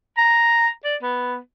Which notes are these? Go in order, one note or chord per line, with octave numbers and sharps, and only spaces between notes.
A#5
D5
B3